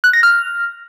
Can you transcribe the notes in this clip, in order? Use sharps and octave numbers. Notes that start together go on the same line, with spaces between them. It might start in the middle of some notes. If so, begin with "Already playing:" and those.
F#6
A#6
F6